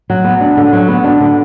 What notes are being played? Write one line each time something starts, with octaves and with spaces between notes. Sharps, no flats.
F#3
B3
D4
D3
F#3
B3
D4
D3